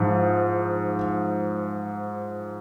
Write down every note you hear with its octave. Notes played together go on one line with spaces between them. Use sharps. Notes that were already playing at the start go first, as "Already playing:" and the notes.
Already playing: G#2 F3